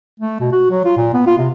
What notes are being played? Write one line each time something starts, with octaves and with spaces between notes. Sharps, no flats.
A3
B2
F#4
F#3
F4
A#2
B3
F4
C3